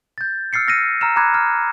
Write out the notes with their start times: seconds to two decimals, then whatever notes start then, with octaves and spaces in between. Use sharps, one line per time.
0.18 G6 A6
0.53 E6 F6 A6 C7 C#7
0.68 E6 F6 A#6 C7 C#7 D#7
1.01 A#5 E6 F6 E7
1.16 A#5 B5 D6 F#6 G#6
1.34 F6